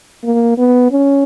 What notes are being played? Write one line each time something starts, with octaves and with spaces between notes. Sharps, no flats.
A#3
B3
C#4